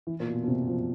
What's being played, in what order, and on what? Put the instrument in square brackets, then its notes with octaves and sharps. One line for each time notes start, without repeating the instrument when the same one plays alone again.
[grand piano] E3
A#2
B2
B2
C3
F3